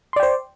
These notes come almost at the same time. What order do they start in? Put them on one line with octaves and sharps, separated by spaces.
C6 D5 G5 C5